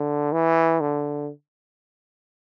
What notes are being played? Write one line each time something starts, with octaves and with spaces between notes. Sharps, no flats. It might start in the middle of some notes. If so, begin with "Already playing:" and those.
Already playing: D3
E3
D3